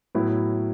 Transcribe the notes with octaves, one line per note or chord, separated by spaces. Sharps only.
A2 F#3 B3 E4